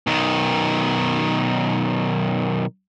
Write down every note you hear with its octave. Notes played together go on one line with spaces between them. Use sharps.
B1 D#3